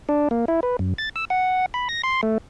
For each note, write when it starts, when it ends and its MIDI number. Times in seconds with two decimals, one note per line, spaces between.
0.09 0.28 62
0.31 0.45 58
0.48 0.60 64
0.63 0.77 71
0.79 0.94 42
0.98 1.09 93
1.16 1.25 88
1.30 1.66 78
1.74 1.88 83
1.89 2.02 94
2.04 2.21 84
2.23 2.38 57